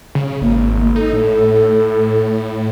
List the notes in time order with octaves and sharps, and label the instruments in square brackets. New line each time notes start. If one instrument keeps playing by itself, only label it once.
[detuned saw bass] C#3
[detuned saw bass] G#1 [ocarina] A#3
[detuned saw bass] D#4 [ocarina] A4
[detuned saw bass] A2